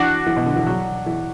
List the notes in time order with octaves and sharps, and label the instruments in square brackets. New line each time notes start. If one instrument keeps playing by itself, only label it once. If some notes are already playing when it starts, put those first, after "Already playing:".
Already playing: [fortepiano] E3 [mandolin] D4 F#4 D5
[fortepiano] E3
B2
D3
E3
F#3
E3